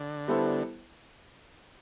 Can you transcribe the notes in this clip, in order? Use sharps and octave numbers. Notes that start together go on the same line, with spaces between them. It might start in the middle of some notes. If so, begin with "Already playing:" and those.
Already playing: D3
G3 B3 E4 A4 C5